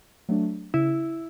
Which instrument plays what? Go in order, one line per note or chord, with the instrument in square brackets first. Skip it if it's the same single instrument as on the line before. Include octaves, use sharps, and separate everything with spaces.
[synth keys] F#3 A3 D4
[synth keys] C#3 [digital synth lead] E4